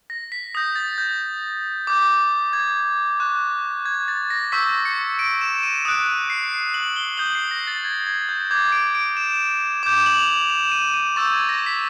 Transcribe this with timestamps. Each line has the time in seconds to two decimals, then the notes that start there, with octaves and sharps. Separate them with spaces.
0.10 A#6
0.32 B6
0.55 D#6 G6 A#6
0.76 A6
0.98 G6
1.87 D6 G6
2.53 G#6
3.20 C#6 F#6
3.86 G#6
4.08 A6
4.30 A#6
4.52 C#6 E6 G6 B6
4.85 C#7
5.19 D7
5.41 E7
5.63 D#7
5.85 D#6 F#6 D7
6.30 C7
6.74 F#7
6.96 G7
7.17 D#6 G6 F#7
7.35 C7
7.51 A#6
7.67 A6
7.84 G#6
8.07 G#6
8.29 G6
8.51 D6 G6 G#6
8.72 D7
8.95 D7
9.17 E7
9.83 D6 G6 E7
10.06 F#7
10.18 F7
10.28 F#7
10.50 E7
10.72 D#7
10.94 D#7
11.16 C#6 E6 G6 A6
11.33 G#6
11.49 A#6
11.66 B6